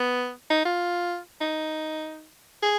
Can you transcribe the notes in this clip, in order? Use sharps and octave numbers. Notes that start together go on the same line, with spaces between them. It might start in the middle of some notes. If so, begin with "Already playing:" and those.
Already playing: B3
D#4
F4
D#4
G#4